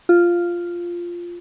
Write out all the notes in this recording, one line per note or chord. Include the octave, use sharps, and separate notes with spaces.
F4